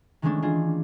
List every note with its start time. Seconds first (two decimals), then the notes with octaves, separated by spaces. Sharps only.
0.22 D#3 E3 G#3 A3 C#4 D4
0.42 D4 D#4 F4 G#4